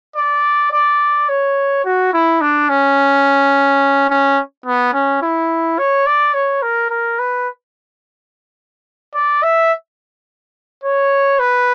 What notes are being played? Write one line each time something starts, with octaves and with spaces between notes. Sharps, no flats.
D5
D5
C#5
F#4
E4
D4
C#4
C#4
B3
C#4
E4
C#5
D5
C#5
A#4
A#4
B4
D5
E5
C#5
B4